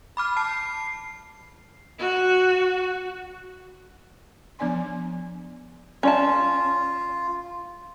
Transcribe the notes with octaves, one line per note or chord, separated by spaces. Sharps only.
B5 D6 F6
A5 C7
F#4
F3 B3 D4 D5 G#5 C6
C#4 F4 D5 A5